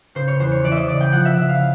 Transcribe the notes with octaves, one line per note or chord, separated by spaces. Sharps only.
C#3 C5
C#5
E2 C5
C#5
E3 D5
D#5 E5
C#3 D5
G5
F3 F#5
E5
C#3 E5
F5